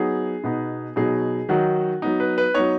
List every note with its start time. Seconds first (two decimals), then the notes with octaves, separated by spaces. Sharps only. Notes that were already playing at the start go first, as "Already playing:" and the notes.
Already playing: F#3 B3 D#4 G#4
0.44 B2 B3 D#4
0.96 B2 F#3 D#4 G#4
1.49 D#3 F#3 D#4 F#4
2.02 F#3 B3 D#4
2.20 B4
2.38 B4
2.55 F#3 B3 D#4 C#5